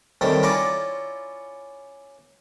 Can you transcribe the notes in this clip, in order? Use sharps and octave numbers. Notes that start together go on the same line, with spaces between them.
D#3 G3 A3 C4 C#4
C#4 E4 F4 C#5 D5 A#5